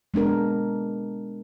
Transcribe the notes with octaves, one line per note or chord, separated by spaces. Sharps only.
G#3 B3 D4 A#4